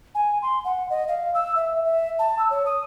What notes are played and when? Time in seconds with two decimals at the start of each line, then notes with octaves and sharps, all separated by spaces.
0.15 G#5
0.42 C6
0.65 F#5
0.90 D#5
1.08 F5
1.35 E6
1.56 E5
1.85 E5
2.19 A5
2.39 E6
2.51 C#5
2.66 D#6